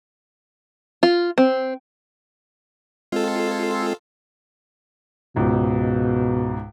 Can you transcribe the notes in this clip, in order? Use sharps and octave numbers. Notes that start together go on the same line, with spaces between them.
F4
C4
G#3 C4 F4 A4
C#2 G#2 B2